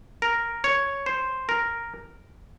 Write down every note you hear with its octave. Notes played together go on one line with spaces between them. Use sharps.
A#4
C#5
C5
A#4